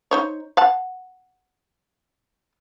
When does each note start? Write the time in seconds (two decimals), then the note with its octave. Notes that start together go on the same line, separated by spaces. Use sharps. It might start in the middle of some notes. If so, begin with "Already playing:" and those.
0.11 D#4 C5 C#5
0.57 F5 F#5 A5